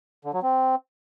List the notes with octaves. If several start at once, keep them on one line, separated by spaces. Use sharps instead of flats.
D3
F#3
C4